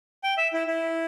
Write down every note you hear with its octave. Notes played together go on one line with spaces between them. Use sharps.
G5
E5
E4
E4